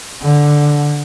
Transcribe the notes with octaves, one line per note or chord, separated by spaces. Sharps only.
D3